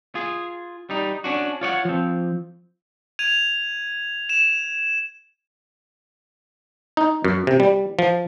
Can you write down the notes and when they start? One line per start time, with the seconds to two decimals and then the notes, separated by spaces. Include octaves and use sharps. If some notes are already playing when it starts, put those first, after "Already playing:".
0.15 F4 G#4
0.90 G3 D#4
1.24 C#4 D4 F#4
1.61 F4 C#5 D5 F#5
1.85 F3 C4
3.19 G#6 D#7 F7
4.29 E7
6.97 D#4
7.24 F#2
7.47 C3
7.60 G3
7.99 F3